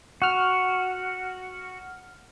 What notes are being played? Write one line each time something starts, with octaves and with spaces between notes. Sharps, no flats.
F#4 F#5 F6